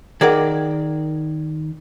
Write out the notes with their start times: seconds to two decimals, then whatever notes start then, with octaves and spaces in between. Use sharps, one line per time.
0.21 D#3 G#4 A#4 D5 F#5